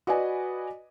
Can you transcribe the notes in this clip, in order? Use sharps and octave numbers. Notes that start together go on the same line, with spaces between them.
F#4 B4 D5 D#5 G#5